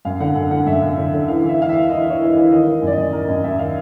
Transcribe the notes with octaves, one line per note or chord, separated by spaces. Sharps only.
F#2 F5
D3 F#5
F#2 F#5
D3 F#5
F#2 E5
F#2
D3
D3
E3 F5
E3 E5
E3 F5
E5
E3
E3 D#5
E3 C#5
E3
D#5
E3
D#3 D#5
D#3
F#2
D5
D#5
F#2
D#3 A#4
F#2 D#5
F#2 E5
D#3 F5